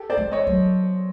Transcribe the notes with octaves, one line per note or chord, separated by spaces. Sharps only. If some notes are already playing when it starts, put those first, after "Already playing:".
Already playing: G4 A4
C5 D5
G#3
C#5 D#5
F#3